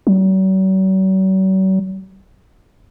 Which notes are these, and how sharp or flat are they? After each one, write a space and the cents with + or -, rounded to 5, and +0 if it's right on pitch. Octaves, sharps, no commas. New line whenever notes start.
F#3 +45